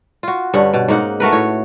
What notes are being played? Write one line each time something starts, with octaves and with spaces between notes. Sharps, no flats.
F4 F#4
G2 D3 C#4 F#5
B2
G#2 A#3 D#4 F#5
A3 F#4 A#4 B4
A2 C#5